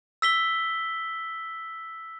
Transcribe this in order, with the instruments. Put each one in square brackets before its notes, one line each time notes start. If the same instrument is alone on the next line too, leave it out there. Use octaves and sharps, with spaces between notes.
[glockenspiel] E6 B6 G7